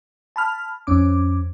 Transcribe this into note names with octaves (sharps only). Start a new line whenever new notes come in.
A5 B5 F6
F2 C#4 D6